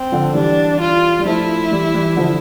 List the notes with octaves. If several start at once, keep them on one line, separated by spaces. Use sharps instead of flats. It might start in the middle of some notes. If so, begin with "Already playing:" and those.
Already playing: C4
D3 F3
E3 G3 D4
F4
G3
F3 A3 E4
E3 G3
E3 G3
D3 F3